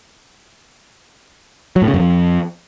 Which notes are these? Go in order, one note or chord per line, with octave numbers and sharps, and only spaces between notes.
F#3
A2
C#3
F#2
F2